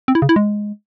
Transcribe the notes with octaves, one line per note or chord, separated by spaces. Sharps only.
C4
E4
C#3
E4
G#3